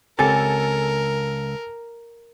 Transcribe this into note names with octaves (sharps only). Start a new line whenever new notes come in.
C#2 C4 G4 A4 A#4 G#5 A6